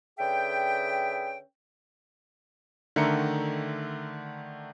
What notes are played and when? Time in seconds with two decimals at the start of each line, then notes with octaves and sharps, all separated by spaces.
0.19 D3 C#4 G#4 B4 E5 G5
2.96 D3 D#3 A3 E5 A#5 C#7